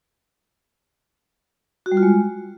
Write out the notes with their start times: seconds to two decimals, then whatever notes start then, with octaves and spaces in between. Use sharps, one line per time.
1.86 F#4
1.92 G3
1.97 F4
2.03 G#3